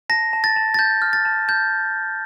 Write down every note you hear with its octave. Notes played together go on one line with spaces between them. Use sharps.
A5 A#6
A5
A6
A5
A6
A5 G6
F6
A6
A5
A5 G6